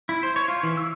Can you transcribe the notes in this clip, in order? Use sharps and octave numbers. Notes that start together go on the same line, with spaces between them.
E4
C5
C#5
F4
E3
E6